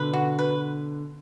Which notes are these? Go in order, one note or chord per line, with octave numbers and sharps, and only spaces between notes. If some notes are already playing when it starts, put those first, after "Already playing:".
Already playing: B2 D3 B4
F#4
B4